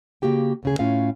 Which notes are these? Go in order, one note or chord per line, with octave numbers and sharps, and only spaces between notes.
C#3 A#3 F#4 G4 G5
D2 C#3 G#4
A2 C#4 F4 F5